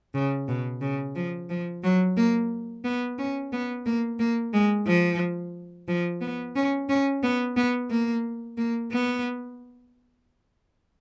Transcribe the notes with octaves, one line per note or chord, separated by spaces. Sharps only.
C#3
B2
C#3
F3
F3
F#3
A#3
B3
C#4
B3
A#3
A#3
G#3
F3
F3
B3
C#4
C#4
B3
B3
A#3
A#3
B3